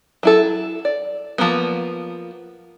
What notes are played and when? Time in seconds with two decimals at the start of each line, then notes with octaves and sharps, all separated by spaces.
0.23 F#3 E4 A4
0.85 D5
1.38 F3 A#3 B3